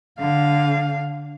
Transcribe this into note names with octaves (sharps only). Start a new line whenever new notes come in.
D3 F5